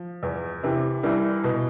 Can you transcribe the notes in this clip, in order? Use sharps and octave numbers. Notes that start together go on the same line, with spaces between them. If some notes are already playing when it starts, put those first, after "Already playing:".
Already playing: F3
E2
C3 E3
C2 E3
B2